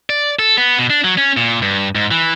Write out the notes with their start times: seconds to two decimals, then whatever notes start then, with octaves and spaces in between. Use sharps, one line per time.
0.10 D5
0.39 A4
0.57 B3
0.78 B2
0.90 D4
1.04 F#3
1.18 C#4
1.37 A#2
1.62 G2
1.95 G#2
2.11 E3